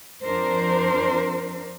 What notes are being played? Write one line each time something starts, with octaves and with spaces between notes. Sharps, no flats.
F2 D4 A#4 C5